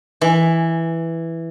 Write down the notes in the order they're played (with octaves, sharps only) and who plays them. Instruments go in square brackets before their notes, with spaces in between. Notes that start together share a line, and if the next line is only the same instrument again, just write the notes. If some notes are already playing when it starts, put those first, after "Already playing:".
[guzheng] E3